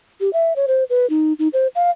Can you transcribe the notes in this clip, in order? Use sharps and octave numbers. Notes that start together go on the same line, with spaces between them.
G4
E5
C#5
C5
B4
D#4
D#4
C5
F5